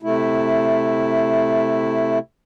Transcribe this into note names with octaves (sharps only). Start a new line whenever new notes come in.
C3 A3 E4